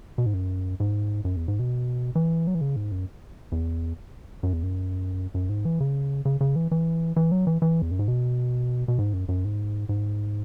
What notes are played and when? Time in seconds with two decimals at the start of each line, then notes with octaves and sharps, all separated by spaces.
0.18 B2
0.26 G#2
0.34 F#2
0.80 G#2
1.25 F#2
1.36 E2
1.48 G#2
1.59 B2
2.15 E3
2.47 F#3
2.55 E3
2.61 C#3
2.76 G#2
2.92 F#2
3.52 E2
4.43 F#2
4.53 E2
4.63 F#2
5.34 F#2
5.49 G#2
5.65 E3
5.80 C#3
6.25 C#3
6.41 C#3
6.56 E3
6.71 E3
7.16 E3
7.32 F#3
7.47 E3
7.62 E3
7.82 E2
7.91 F#2
7.99 G#2
8.08 B2
8.88 B2
8.99 G#2
9.13 F#2
9.29 F#2
9.44 G#2
9.89 G#2